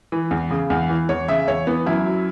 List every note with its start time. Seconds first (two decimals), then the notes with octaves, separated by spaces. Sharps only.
0.12 E3
0.31 E2
0.50 C#3
0.70 E2
0.89 E3
1.09 E2 C#5
1.28 C#3 E5
1.47 E2 C#5
1.67 E3 B3
1.86 F#2 E4
2.06 F#3